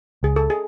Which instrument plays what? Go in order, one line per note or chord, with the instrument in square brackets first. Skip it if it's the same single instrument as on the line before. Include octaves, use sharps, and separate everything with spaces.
[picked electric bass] C#2 [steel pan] G#4
[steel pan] A4
G#4